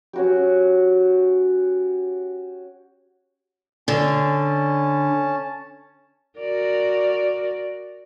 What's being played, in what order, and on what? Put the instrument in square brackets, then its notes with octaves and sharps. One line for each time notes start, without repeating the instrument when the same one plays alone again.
[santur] C#4 F#4 G4
[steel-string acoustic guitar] D3 [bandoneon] C#4 A5
[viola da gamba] F#4 A#4 D5